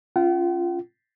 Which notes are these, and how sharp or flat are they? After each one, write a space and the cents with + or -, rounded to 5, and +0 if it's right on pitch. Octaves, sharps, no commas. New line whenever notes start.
C#4 +0 F4 -10 F#5 +45